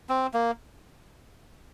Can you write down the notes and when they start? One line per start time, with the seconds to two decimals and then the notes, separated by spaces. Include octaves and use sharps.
0.09 C4
0.34 A#3